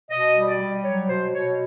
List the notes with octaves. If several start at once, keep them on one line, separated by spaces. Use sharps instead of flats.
B2 D#5
G3
D5
G3
F#3 C#5
B2 C5
B2 C#5